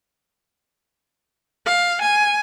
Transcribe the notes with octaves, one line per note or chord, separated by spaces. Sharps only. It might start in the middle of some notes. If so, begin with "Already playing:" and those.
F5
G#5